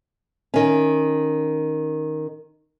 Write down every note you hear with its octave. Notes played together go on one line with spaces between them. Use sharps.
D#3 C#4